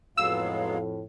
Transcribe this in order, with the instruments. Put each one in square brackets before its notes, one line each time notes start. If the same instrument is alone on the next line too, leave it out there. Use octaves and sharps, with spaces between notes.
[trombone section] F2 A2 [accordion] F#3 G#3 B3 [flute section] F5 [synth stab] E6